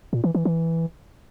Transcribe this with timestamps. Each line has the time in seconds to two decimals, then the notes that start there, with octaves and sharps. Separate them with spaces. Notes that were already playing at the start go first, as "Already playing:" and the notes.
0.13 A#2
0.24 E3
0.35 E3
0.45 E3